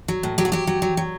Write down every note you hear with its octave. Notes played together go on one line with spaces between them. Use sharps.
F#3
A2
F#3 G4
F#4
F#3 G4
F#3
F#3
F#3